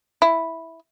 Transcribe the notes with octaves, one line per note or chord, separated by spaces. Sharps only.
E4